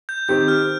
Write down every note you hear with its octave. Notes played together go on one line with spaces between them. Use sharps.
G6
D#3 C4 G4 G6
F6